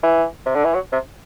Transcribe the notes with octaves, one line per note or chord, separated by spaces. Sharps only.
E3
C3
D3
E3
F#3
C3